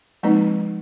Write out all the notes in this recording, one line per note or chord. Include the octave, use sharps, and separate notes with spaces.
F3 G#3 A#3 C4 D#4 B4